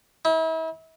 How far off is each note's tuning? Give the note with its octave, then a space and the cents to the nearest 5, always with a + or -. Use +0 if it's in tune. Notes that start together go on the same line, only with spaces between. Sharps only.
E4 -40